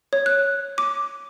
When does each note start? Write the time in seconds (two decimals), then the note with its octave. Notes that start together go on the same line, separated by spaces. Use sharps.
0.13 C#5
0.26 F#6
0.78 D6